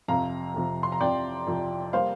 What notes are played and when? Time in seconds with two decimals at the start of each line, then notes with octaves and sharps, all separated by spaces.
0.08 F2 C3 F3 F5 A#5
0.54 F2 C3 F3
0.83 C6
0.92 A#5
1.00 F2 C3 F3 D5 G5
1.47 F2 C3 F3
1.93 G3 A#3 C5 F5